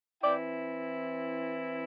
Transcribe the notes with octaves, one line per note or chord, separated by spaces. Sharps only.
E3 C4 E4 D5 G5